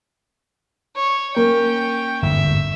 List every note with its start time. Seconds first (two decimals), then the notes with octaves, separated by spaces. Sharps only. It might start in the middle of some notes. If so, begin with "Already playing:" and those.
0.95 C#5
1.36 A#3 C#4 G5
2.22 G1 E2 G#2 E5